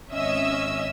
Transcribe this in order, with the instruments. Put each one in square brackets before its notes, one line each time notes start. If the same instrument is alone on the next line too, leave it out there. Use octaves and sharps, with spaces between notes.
[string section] G#1 C#4 D#5 E5 E6